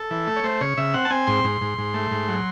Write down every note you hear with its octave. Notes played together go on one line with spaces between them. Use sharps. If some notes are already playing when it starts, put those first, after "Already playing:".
Already playing: A4
E3
A3
C#5
A3 C5
C#3 C#5
C#3 E5
C4 F#5
A5
C4 G#5
G#2 C6
G#2
G#2
G#2
A3
G#2
F#3